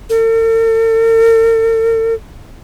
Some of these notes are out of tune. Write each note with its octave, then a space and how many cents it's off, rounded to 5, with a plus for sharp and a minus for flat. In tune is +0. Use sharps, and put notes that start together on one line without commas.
A4 +45